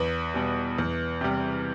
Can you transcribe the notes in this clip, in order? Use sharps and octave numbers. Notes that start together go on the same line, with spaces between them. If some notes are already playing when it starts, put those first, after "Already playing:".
Already playing: E2 B4
B2 G3
E2
C3 G3